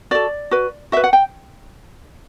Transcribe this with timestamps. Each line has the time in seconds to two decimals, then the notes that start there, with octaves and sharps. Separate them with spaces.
0.11 F#4 A4 D5
0.51 F#4 B4
0.92 F#4 B4 E5
1.04 F#5
1.13 G5